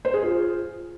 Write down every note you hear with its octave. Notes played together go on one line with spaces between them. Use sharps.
C5
G#4
F4